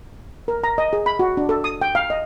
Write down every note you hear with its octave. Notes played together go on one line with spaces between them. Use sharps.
A#4
A#5
D#5
G#4
B5
F#4
D4
A4
D#6
G5
F5
D#5